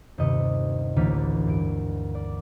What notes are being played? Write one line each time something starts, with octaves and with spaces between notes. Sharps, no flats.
D#1 G2 C3 D#5 C#7
A1 D2 E3 A#3 F6 B6
G2 D7
D5